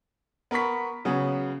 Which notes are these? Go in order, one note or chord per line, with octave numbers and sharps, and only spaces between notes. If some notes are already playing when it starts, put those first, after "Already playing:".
B3 A#4 B5 C#6 B6
C#3 F#3 B3 C#4